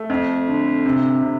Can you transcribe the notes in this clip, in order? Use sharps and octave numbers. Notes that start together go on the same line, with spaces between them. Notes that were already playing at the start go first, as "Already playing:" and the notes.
Already playing: A3
F2
D3
C3
C3